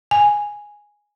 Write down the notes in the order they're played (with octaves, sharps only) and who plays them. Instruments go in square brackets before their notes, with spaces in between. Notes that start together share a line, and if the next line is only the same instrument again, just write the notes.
[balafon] G#5